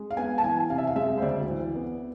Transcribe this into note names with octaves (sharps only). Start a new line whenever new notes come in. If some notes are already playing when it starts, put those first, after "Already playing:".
Already playing: G#3
F5
B3 G#5
A5
E3 G#5
C3 F5
E5
F5
G#3 E5
C5
D2 D5
E3
B3